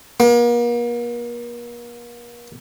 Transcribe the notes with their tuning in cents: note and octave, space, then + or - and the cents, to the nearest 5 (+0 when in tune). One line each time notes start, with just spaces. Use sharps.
A#3 +40